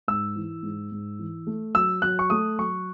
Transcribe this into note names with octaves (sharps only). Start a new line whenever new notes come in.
G#2 E6
E3
G#2
G#2
E3
A3
F#3 E6
F#3 F#6
C#6
A3 D#6
F#3 C#6